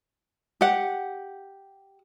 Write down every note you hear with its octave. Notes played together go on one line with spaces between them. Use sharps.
G4 F#5